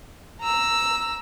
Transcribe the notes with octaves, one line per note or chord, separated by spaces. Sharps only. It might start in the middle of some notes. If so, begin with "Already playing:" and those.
A#5 E6